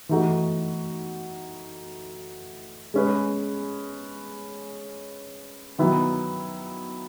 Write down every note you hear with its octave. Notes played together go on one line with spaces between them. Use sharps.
E3 A3 D#4 F#4
G#3 C#4 G#4 B4
D#3 F#3 B3 E4